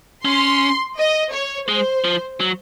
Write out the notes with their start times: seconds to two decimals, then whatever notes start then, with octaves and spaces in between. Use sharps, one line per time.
0.25 C#4 C6
0.97 D#5
1.32 C#5
1.68 G#3 C5
2.04 F3
2.40 F#3